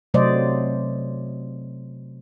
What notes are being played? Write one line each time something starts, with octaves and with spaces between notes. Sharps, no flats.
C3 F#3 A3 C5 D5 D#5